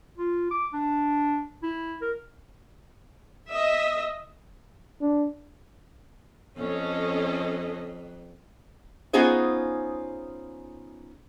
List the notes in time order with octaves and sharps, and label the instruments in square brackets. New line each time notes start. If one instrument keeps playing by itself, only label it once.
[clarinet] F4
D6
D4
E4
A#4
[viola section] D#5 E5
[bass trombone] D4
[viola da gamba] F2 [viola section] C#4 A4 D#5
[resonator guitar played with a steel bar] B3 C#4 D#4 F4 G#4 C5